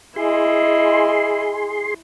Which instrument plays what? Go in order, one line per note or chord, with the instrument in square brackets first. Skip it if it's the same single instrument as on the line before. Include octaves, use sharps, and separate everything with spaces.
[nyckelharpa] E4 D#5 [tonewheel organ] G#4 C6